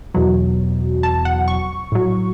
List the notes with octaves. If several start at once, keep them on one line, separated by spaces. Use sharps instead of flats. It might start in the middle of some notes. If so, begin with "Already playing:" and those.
E2 B2 F#3
A5
F#5
C#6
A2 F#3